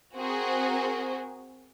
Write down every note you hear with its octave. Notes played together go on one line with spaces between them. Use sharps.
C4 F#4 G#4 A#4 C5